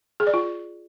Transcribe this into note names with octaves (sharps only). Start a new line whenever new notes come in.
G#4
D5
F4